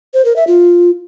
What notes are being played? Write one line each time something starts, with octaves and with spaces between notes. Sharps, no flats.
C5
A#4
E5
F4